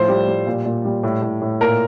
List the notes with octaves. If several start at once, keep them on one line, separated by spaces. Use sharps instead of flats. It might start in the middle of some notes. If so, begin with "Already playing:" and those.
Already playing: A2 F3 C5
G3
G3
A#2
A#2
G3
A2
A2
A2
A#2 A#4